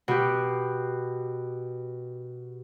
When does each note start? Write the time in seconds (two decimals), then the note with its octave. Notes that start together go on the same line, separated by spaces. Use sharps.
0.08 B2 G4